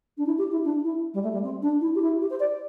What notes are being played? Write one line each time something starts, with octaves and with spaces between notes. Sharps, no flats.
D4
E4
G4
E4
D4
E4
G3
A3
G3
C4
D4
E4
G4
E4
G4
C5
D5